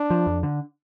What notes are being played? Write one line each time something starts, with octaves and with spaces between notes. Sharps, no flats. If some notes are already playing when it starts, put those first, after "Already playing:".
Already playing: D4
F3
F2
D3